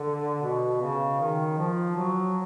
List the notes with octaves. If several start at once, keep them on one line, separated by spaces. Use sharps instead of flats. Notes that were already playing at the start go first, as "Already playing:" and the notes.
Already playing: D3
B2
C#3
D#3
F3
F#3